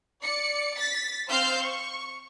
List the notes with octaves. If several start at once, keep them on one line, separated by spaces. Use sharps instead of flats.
D5 C#7
A6 B6
C4 C5 F5 F6 G6
C#6